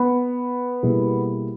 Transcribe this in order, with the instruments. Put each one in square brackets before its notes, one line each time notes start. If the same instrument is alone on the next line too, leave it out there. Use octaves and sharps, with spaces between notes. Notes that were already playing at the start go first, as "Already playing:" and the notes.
Already playing: [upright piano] B3
[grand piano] B2 G3 A#3 E4 G#4